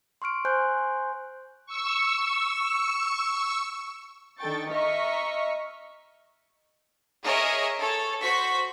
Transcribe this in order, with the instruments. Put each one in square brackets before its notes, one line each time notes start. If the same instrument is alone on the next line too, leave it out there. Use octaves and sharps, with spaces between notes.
[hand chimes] C6 C#6 F6 D7
C5 G#5 C6 F#6 G6
[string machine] C#6 E6
[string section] D#3 D4 A4 G5 C#6 A6
D#5 E5 A#5 C#6 F6 B6
[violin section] G#4 A#4 C#5 D#5 E5
A4 C#5
F#4 C5 C#6 B6